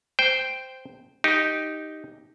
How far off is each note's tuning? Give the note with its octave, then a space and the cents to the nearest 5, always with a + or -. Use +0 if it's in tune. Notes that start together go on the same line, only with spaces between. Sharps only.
C5 -5 G5 +0
D#4 +0 G4 +0